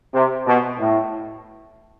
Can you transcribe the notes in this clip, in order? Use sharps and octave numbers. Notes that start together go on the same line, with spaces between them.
C3
B2
A2